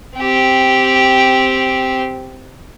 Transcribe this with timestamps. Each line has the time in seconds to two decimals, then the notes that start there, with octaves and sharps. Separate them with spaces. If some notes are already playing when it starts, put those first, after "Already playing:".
0.16 C4 G4